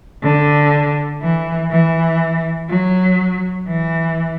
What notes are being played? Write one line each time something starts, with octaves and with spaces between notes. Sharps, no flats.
D3
E3
E3
F#3
E3